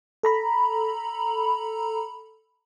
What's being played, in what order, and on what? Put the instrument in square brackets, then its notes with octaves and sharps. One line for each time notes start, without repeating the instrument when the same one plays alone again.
[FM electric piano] A4 A#5 B5